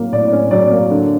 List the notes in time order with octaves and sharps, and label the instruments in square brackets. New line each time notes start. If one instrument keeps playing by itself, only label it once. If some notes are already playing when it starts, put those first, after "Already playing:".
Already playing: [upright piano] A2 F#3 A#3 C#4
A2 D5
C#4
F#3 D5
A#3
D3